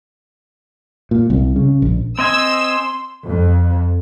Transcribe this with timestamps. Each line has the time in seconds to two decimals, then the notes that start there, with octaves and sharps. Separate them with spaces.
1.11 A#2
1.30 C2
1.56 C#3
1.82 A#1
2.19 C4 D#5 G#5 C6 E6
3.25 F2